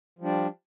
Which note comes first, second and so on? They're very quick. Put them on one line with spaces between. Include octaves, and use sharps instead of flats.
F3 G3 D4